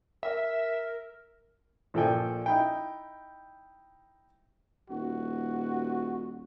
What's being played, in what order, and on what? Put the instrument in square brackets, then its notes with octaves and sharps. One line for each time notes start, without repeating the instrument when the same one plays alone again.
[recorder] A#4 [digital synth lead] E5
[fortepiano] A#1 F3 A4 D5 G5 G#5
D#4 E4 G5
[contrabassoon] D#1 [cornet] F#4